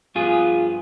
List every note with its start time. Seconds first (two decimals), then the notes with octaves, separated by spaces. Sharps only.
0.15 G2 F3 B3 F4 G#4